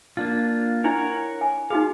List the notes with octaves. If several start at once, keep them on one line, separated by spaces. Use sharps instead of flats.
A#3 D4 F4
D4 E4 A#4 C#5 F#5
G#5
D#4 F#4 G#4 F5